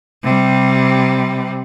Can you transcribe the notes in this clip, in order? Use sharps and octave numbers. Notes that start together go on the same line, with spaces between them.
C3 G3